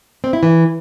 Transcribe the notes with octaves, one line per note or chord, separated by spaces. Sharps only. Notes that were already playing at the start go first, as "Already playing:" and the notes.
C4
E4
E3